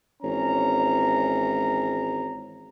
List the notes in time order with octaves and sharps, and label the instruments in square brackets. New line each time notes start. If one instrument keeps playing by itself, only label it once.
[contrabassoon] G#1 [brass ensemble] E3 C#4 A#5